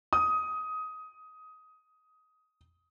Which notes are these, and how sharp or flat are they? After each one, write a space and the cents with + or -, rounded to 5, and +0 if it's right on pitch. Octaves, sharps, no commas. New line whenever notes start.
D#6 +15